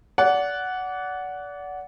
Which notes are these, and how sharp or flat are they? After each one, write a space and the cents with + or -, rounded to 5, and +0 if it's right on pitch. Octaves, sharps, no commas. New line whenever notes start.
D5 -30 F#5 +0